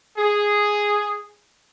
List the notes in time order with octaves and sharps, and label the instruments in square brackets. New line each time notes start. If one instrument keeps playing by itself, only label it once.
[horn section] G#4